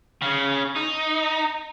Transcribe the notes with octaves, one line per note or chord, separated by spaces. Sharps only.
C#3
D#4